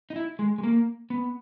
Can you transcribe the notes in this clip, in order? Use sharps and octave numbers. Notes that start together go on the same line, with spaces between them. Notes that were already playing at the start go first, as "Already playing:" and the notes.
D#4
E4
G#3
G#3
A#3
B3